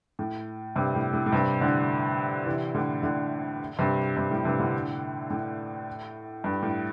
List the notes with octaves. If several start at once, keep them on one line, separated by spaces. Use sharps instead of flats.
A2
G2 C3
A2
A2
A2
G2 C3
A2 D3
C3 E3
A2 D3
A2 D3
G2 C3
G2 C3
A2
G2 C3
A2 D3
A2
G2
A2